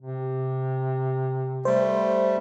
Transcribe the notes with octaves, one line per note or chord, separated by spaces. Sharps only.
C3
G3 A3 C5